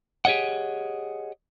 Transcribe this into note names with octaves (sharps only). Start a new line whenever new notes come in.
G4 G#4 C#5 D#5 F#5